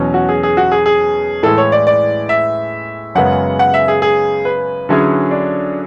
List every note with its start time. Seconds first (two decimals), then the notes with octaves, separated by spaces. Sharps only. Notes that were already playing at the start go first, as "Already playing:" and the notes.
Already playing: E2 B2 F#3 C#4
0.14 F#4
0.29 G#4
0.43 G#4
0.57 F#4
0.72 G#4
0.86 G#4
1.43 A2 E3 G#3 A4
1.58 C#5
1.72 D5
1.87 D5
2.29 E5
3.15 F#2 C#3 G#3 B3 F#5
3.59 F#5
3.74 E5
3.88 G#4
4.02 G#4
4.45 B4
4.89 D3 F#3 C#4 E4 G#4
5.31 D4